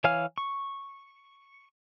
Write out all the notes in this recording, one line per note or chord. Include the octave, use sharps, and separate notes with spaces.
E3 C#5 F5 G#5 F6
C#6